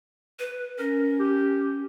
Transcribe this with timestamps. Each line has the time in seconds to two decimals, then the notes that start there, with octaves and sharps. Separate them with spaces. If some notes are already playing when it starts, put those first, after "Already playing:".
0.39 B4
0.78 C#4 A#4
1.19 G4